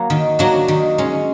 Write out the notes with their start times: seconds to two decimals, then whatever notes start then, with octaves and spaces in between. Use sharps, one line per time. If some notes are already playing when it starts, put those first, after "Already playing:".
Already playing: F#3 A#3 F#4
0.10 D#3
0.39 F#3 A#3 D4 F#4
0.68 D#3
0.98 G#3 C#4